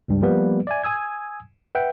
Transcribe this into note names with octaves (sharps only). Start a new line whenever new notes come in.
C#2 G2 G3
F3 G3 A#3 B3 B4
D5 E5 G#5
G#5 D#6 E6 G#6
B4 E5 F#5 G5